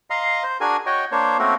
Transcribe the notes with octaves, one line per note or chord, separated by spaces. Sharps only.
D#5 F5 A#5 C6
C5
D4 F#4 G#4 A#4 G#5
F#4 C#5 D#5 G5
A#3 D4 C5 C#5
A3 A#3 C4 C#4 F#4 A#4